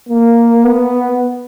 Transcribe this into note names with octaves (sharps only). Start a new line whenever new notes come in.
A#3
B3